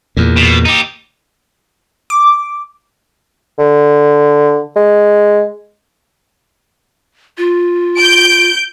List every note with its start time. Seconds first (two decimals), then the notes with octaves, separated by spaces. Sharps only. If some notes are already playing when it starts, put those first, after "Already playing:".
0.17 E2 A#2
0.36 B2
0.65 D#4 G4
2.10 D6
3.59 D3
4.76 G#3
7.38 F4
7.97 G6 D7